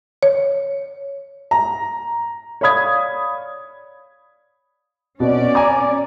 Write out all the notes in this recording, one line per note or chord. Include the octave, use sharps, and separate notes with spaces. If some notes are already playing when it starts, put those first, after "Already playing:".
C#5
A#5
C#5 D5 F5 B5 D#6 G#6
B2 C#4 D5
G#5 A#5 D6